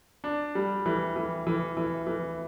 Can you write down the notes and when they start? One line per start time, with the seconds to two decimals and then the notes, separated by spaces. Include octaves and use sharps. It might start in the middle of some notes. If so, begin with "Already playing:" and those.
0.24 D4
0.55 G3
0.86 E3
1.16 E3
1.47 E3
1.77 E3
2.07 E3